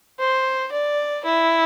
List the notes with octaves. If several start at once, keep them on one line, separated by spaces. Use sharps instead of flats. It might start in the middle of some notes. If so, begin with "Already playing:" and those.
C5
D5
E4